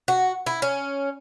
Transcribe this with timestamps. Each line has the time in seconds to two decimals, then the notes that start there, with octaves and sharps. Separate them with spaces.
0.08 F#4
0.46 E4
0.62 C#4